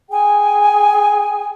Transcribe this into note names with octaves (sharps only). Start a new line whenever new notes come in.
G#4 G5 G#5